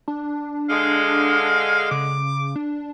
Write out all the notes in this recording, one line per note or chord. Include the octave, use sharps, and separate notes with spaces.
D4
D3 G#3 F5
C#3 D6
D4